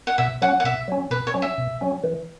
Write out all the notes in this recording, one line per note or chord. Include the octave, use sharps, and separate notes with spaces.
F#5
B2 E5
F#3 C#4 F#5
F#5
B2 E5
F#3 C#4
B2 B4
C#5
F#3 C#4
E5
B2
F#3 C#4
E3